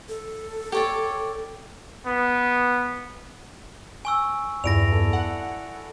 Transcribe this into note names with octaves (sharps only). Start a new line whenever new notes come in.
A4
G4 C#5 D5
B3
G#5 C#6 E6
E2 G2 E4 D5 A#6 D7 F7
A4
F#5